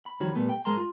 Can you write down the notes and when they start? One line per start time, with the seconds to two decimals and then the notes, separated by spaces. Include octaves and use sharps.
0.06 B5
0.20 F2 D#3 G3 F#4 C#5 B5
0.35 A#2 G3 A3 B3
0.49 G5
0.65 G#2 G#3 A#4 A5 A#5 C6
0.77 F4